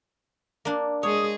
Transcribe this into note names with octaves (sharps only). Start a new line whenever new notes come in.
A#3 D4
G#3 G#4 C#5 D#6